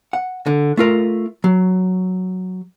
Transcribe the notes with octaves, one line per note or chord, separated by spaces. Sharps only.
F#5
D3
A3 F4 A#4
F#3